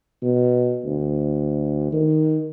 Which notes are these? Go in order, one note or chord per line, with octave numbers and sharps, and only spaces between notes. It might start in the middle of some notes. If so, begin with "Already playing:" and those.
B2
D2
D#3